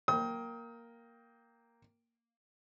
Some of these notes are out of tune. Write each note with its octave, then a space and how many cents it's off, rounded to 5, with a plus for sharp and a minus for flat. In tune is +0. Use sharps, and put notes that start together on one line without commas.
A#3 +0 G5 +0 D#6 +35